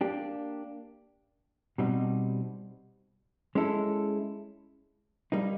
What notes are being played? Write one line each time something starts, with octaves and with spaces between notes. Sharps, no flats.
A#3 D4 G4
B2 G3 C4 D#4
G#3 C#4 E4 A4
G3 A#3 D#4